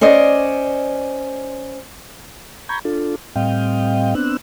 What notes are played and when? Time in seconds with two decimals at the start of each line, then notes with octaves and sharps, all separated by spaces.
0.01 C#4 C5 D5 D#5
2.69 A#5 B5 C#6 G6 G#6
2.85 D4 F4 A4
3.36 A2 G3 C4 D#5 F5 G5
4.15 B3 C4 D4 E6 F#6